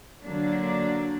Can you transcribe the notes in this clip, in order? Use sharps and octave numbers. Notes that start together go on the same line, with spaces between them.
D3 F#3 A#3 D4